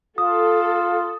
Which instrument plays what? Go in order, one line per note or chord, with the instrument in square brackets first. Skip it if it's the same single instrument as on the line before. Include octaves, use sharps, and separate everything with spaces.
[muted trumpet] F4 [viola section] A4 [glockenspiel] D#6